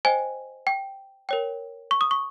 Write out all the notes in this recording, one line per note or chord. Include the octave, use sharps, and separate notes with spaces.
C5 D#5 G5 G#5
G5
A#4 C#5 G5
C#6
D#6
C#6